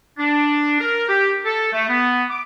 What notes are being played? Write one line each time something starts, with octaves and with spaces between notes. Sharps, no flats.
D4
A#4
G4
A4
A3
B3
D6